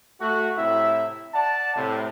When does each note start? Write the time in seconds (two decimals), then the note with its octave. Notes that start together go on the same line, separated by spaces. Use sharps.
0.21 A3 F#4
0.58 A2 C3 E4 E5
1.34 D5 F#5 A5
1.76 A2 C3